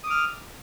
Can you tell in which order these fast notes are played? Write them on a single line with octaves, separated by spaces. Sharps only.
D#6 D6 F6